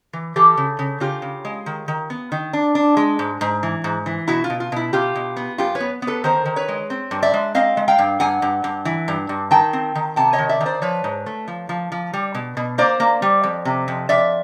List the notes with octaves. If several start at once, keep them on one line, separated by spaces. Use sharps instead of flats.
E3
E3 G4 A4
C#3
C#3
C#3 F4 G4
C#3
G#3
D#3
D#3
B3
D#3
D4
D4
G#3
G#2
G#2
E3
G#2
E3
B2 E4 F#4
F4
B2
F4
B2 E4
B2 F4 G4
B2
B3
F#2 F4 G4
B4 C#5
B3
B3
A4 B4
D#3 A#4 C5
D#3
B4 C#5
G#3
C4
G2
D5 E5
G#3
C4 D#5 F5
G#3
F5 G5
G2
G2 F#5 G#5
G2
G2
E3
G2
G2
D#3 G5 A5
C4
D#3
C3 G5 A5
C#5 D#5
D#3
D5 E5
D#3
C5 D5
F3 B4 C#5
G#2
A3
F3
F3
F3
G3
B2
B2
A#3 C5 D5
A#3
G3
F2
C3
F2
F2 D5 E5